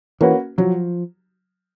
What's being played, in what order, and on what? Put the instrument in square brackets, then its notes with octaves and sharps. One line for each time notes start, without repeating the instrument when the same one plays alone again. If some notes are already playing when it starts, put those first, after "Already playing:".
[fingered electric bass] E3 [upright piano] A#3 C#4 F#4 B4
[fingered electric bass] F3 [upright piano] F#3